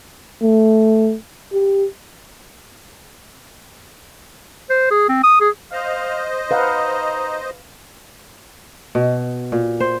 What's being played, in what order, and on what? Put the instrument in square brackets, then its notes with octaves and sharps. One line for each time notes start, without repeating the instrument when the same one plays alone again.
[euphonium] A3
G4
[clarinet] C5
G#4
C4
D#6
G#4
[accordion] C5 D#5 [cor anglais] F5
[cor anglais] D#4 [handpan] B4 F5 F#5
[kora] B2
A#2
C5